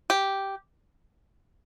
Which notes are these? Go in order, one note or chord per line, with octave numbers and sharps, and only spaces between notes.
G4